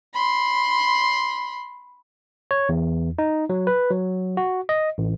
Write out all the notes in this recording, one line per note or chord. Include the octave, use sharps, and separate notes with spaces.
B5 C6
C#5
E2
D#4
F#3
B4
F#3
F#4
D#5
A1